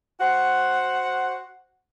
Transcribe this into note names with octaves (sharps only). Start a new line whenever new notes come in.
F#4 C5 F#5